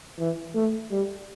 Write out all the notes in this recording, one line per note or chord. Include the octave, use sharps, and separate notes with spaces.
E3
A3
G3